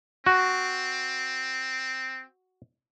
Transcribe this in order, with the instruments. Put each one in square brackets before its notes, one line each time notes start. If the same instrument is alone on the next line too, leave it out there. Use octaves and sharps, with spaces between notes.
[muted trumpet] C4 [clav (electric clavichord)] F#4